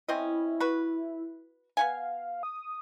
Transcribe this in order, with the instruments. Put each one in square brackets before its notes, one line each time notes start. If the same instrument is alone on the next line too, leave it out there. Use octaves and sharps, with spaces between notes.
[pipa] C4 C#4 D#5 [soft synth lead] E4
[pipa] F#4 B4
[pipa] B3 F#5 G#5 [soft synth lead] F5
[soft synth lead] D#6